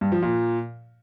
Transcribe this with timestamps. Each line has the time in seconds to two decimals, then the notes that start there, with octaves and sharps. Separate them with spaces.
0.01 G2
0.12 F3
0.22 A#2